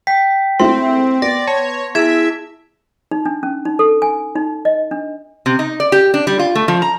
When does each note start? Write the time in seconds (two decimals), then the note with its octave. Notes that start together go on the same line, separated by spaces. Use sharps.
0.07 G5 B6
0.60 G#3 A3 C4 E4 C6
1.22 B3 D5 A#6
1.47 C#5 A5
1.95 E4 G#4 E5 G#6 E7
3.11 D#4
3.25 D4
3.43 C#4
3.65 D#4
3.79 A4
4.02 G#5
4.36 D#4
4.65 D#5
4.91 D4
5.46 C3
5.59 D#4
5.80 D5
5.92 G4
6.14 D4
6.27 G3
6.39 F4
6.55 A3
6.68 F3
6.82 A#5